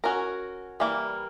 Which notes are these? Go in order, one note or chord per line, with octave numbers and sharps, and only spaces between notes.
C#4 F#4 A#4
E3 G3 A#3